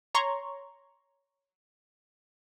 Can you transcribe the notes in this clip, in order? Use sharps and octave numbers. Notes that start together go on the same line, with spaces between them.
C#5 A#5 C6 C#6